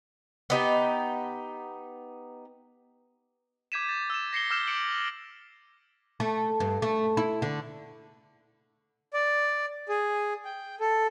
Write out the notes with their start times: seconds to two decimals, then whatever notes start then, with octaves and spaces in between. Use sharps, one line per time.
0.50 B3 D#4 G4
3.72 D6 G6 G#6 B6 D#7 E7
3.89 A6
4.10 E6 E7
4.33 A#6 C7 C#7 G7
4.50 D6 E6 F6 G6 E7
4.67 D6 C#7 D7 F#7
6.20 A3
6.60 G2
6.82 A3
7.17 E4
7.42 D3
9.14 D5
9.89 G#4
10.45 G5
10.80 A4